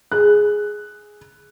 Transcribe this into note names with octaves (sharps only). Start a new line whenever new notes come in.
G#4 F#6